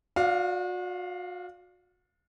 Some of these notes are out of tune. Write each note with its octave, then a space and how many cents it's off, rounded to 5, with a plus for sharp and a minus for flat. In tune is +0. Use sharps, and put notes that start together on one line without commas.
F#4 -40 D5 +0 F5 +0